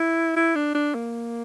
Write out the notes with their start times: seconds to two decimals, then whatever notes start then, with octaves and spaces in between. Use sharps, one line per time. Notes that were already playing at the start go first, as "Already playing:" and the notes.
Already playing: E4
0.36 E4
0.56 D4
0.75 D4
0.95 A#3